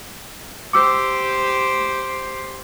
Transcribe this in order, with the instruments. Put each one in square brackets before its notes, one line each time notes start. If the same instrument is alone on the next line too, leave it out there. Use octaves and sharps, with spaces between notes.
[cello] G4 C5 [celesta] D6 E6